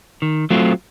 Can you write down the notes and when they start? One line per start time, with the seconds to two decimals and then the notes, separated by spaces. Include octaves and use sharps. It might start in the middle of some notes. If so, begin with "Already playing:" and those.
0.22 D#3
0.50 F#3 A3 C4 F4